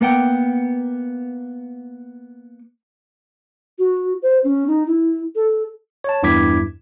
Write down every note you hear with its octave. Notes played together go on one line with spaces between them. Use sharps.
A#3 B3 F#5 G5
F#4
C5
C#4
D#4
E4
A4
C#5 A5
E2 G2 E4 D6 G#6 B6